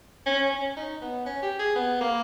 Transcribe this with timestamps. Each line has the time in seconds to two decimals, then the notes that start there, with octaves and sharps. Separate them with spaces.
0.26 C#4
0.51 C#4
0.77 D#4
1.01 B3
1.26 C#4
1.42 G4
1.59 G#4
1.76 B3
2.01 A#3